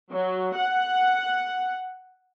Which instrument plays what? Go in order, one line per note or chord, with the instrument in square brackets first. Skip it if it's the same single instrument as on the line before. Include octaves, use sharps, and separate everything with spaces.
[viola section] F#3
F#5